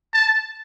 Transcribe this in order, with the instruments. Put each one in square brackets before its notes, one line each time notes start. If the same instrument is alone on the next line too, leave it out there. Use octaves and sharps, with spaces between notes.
[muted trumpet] A5